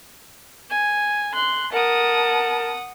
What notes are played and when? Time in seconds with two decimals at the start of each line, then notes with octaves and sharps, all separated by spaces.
0.70 G#5
1.34 C6 F#6
1.72 A#4 F#5 A5 D#6